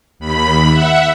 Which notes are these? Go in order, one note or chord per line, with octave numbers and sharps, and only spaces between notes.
D#2 B5
E5 F#5